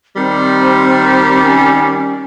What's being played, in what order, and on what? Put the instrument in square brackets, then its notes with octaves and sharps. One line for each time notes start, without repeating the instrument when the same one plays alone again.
[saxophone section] D#3 G3 [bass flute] C4
[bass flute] C#4